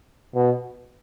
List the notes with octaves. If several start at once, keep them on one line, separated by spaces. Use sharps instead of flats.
B2